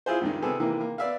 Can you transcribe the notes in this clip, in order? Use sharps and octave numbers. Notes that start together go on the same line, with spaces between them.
E4 F4 G#4 C5
C#2 G2 D#3
C3 B3 G#4 A4
C3 D#3 E3 A#3
A#3
B3 D5 E5 F5